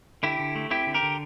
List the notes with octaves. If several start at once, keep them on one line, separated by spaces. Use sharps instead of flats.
D3 E4 G4
D3
A3
C4 E4 G4
D3
G4 A#4
D3